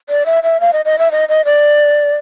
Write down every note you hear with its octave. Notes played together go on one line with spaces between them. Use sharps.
D5
E5
E5
F5
D#5
D#5
E5
D#5
D#5
D5